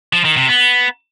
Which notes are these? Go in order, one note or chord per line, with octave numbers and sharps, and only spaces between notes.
F3
D#3
C3
B3